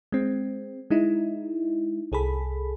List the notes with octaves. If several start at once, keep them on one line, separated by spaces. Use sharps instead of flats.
G#3 C4
G#3 D#4 E4
C2 G#4 A4 B5